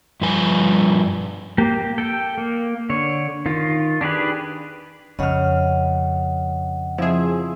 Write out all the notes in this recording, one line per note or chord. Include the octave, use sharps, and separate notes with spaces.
G2 F3 B4 G#5
A#3 G4
A4 G5
A#3
D3 C#5
D#3 F4
D4 G4 G#4 B4
F2 C#3 D#5 F#5 F6
F3 C4 E4 G#4 E5